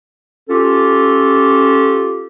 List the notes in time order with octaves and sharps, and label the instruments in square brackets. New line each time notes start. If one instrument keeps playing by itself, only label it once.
[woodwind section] C#4 F4 G4 A4